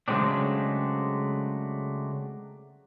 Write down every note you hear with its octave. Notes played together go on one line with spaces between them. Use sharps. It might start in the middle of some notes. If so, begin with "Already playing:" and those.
C#3 F#3 G#3 A3 C4 D4